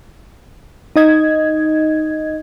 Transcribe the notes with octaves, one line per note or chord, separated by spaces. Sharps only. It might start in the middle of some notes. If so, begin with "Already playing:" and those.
D#4 D#5 G#6